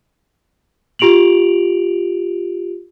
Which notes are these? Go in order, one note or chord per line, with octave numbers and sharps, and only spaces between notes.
F4 G4 D7 F7 F#7